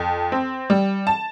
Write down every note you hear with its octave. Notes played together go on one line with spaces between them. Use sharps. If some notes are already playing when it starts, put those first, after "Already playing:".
Already playing: F2
C4
G3
A5